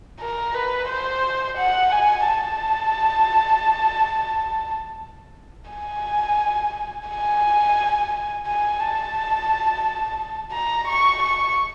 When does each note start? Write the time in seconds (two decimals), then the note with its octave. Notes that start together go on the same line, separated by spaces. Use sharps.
0.20 A#4
0.54 B4
0.88 C5
1.58 F#5
1.92 G#5
2.27 A5
5.71 G#5
7.08 G#5
8.46 G#5
8.80 A5
10.52 A#5
10.88 C#6
11.22 C#6